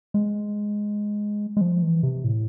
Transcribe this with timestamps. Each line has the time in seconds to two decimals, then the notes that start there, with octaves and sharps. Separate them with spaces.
0.14 G#3
1.57 G#3
1.61 F3
1.82 E3
2.03 C3
2.24 A2